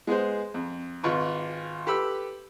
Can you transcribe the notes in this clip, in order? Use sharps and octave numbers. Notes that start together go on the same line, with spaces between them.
G#3 B3 G#4 C5
F2
G#1 F4 B4 C#6
G4 A4 B4 B5 E6